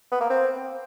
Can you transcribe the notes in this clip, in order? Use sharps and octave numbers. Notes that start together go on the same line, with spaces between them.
B3
A#3
C4